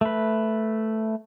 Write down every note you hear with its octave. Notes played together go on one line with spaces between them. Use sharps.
A3 B4